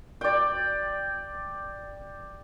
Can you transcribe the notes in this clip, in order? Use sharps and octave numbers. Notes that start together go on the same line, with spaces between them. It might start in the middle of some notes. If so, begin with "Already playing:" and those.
D5 G5